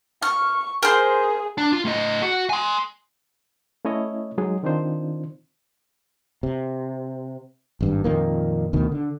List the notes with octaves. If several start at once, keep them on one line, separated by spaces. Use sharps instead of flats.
C#6 F6
G#4 A#4 C5
D4
F4
A2 D#5
F#4
G#5 C6
A3 C#4 E4 C#5 D#5
F#3 G#3 D#4 G#4
D#3 C4 D4 D#4 F4 C5
C3
G#1 G2
F2 A#2 D#3 A#3
D2 B2 D#3
D3